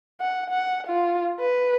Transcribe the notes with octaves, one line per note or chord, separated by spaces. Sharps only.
F#5
F#5
F4
B4